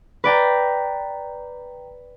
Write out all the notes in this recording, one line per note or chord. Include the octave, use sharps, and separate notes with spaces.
B4 D5 G5 A#5